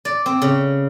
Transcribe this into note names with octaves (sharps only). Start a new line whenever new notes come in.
D5
C4
C#3